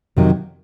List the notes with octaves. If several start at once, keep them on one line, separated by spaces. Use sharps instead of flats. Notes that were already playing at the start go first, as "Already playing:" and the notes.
F2 C3 D#3 F#3